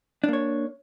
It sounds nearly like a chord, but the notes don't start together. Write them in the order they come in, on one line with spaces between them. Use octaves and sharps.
D4 A#3 C#5